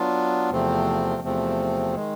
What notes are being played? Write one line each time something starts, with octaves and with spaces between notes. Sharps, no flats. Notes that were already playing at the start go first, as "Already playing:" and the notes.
Already playing: F#3 B3 D4 F4
E2 C3 F3 A3 C4
E2 C3 F3 A3 C4
D#3 G#3